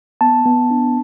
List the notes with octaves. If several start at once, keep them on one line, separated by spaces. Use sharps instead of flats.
B3 A5
B3
D4